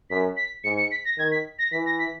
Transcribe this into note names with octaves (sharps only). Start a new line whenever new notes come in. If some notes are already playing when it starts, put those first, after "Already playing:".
F#2 B6
B6
G#2 C#7
C#7
B6
A#6
D#3 G#6
B6
A#6
E3 B6
A#6
B6